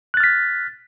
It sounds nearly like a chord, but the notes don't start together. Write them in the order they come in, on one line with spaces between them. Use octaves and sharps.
F#6 A6 F6 B6